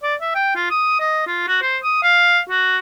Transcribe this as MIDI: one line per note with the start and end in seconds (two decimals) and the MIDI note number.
0.03 0.15 74
0.21 0.33 76
0.35 0.52 79
0.55 0.69 65
0.71 0.98 87
1.00 1.22 75
1.27 1.46 65
1.48 1.58 66
1.63 1.78 72
1.84 2.02 87
2.03 2.39 77
2.49 2.78 66